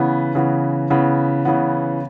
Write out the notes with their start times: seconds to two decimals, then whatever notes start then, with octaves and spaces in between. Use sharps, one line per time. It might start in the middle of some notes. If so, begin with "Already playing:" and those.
Already playing: C#3 E3 B3
0.35 C#3 E3 B3
0.90 C#3 E3 B3
1.45 C#3 E3 B3